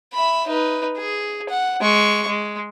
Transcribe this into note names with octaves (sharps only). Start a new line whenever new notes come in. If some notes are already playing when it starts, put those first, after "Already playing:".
E5 B5
D#4 B4
G#4
F#5
G#3 C#6
G#3